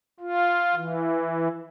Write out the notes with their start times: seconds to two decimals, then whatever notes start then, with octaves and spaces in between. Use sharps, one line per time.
0.20 F4
0.75 E3